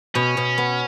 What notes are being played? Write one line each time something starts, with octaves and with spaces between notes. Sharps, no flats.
B2 C#4
B2
B3